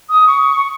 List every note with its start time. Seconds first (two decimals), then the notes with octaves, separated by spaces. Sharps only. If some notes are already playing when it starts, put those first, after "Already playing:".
0.09 D#6
0.27 C#6